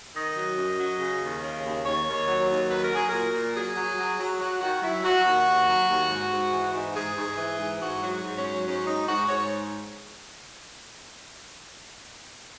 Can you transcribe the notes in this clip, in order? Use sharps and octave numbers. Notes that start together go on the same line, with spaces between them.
D#3 D#5
F#3
F#2
F#3
C#3
D#2
C#3
D#2
D#2 C#5
D#2
F#3
D#2
F#3 B4
A#4
F#3 G#4
A#2 A#4
A#2
F#3 G#4
F#3
F#3
F#3
F#3 F#4
D#3 F#4
F#3 E4
F#3 F#4
D#2
D#2
F#3
D#2
G#2
G#2
E3
G#2
G#2 G#4
G#2
E3
G#2
G#2 F#4
F#3
G#2
C#4
F#3
G#2 C#4
G#2 D#4
G#2 F#4
G#2 C#5